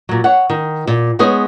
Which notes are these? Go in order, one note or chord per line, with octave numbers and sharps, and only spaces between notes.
A#2 F#3
C#5 F#5
D#3
A#2
G#3 B3 D#4 G#4 C#5